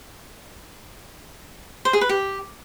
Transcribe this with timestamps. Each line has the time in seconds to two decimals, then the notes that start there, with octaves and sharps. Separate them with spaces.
1.85 C5
1.93 G#4
2.01 B4
2.09 G4